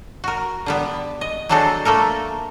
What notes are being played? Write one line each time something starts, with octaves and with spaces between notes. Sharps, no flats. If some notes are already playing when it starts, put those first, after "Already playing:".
F#4 A#4
D3 G3 B3
D#5
F#3 G#3 D4 F#4 A4 C5
A3 A#3 A4 A#4